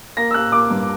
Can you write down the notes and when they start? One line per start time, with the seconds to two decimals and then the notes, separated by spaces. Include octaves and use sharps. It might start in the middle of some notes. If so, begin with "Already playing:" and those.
0.17 A#3 A#6
0.31 E6
0.34 A#3 F#6
0.52 A#3 D6
0.70 G2